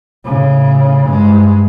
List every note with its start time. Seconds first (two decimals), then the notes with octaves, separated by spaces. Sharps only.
0.25 A2 C#3
1.06 G2 G#3